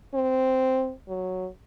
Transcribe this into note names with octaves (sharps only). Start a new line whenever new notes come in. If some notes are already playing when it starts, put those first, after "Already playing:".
C4
F#3